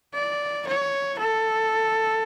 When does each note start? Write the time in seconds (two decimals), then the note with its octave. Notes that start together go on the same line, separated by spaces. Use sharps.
0.14 D5
0.67 C#5
1.19 A4